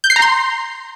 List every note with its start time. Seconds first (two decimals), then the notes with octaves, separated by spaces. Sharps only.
0.04 G6
0.10 C7
0.16 A#5
0.22 C6